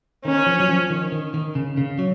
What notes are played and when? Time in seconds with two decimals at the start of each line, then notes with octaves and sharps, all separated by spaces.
0.25 D#3 C#4
0.46 F3
0.60 F#3
0.68 F3
0.90 D#3
1.12 D#3
1.34 D#3
1.55 C#3
1.77 C#3
1.99 F#3